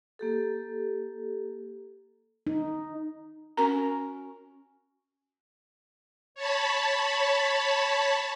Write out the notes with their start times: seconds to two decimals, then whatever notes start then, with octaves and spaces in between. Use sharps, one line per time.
0.19 A#3 G4 A4
2.47 D#4
3.57 C#4 F#4 A#4 A#5
6.35 C#5 A5 B5